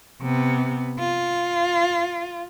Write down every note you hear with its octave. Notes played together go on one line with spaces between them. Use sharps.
C3 B3
F4